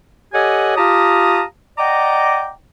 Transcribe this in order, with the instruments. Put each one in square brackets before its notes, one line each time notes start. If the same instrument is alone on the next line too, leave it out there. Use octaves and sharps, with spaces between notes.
[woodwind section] G4 A4 C#5 D#5 F#5 G#5
F4 G4 F5 A5 A#5 D#6
D5 D#5 F#5 G5 A#5 D6